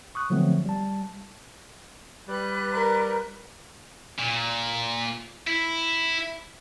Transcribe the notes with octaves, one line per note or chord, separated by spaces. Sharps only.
C#6 D#6 F#6
D3 F3 F#3 A3 B3 C4
G3 A5
G3 B4 F#6
A#4
A#2
E4